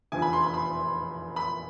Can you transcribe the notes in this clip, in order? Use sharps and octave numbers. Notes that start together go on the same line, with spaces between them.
F1 E2 D3 F3 G#5
B5
C6
B5
B5
B5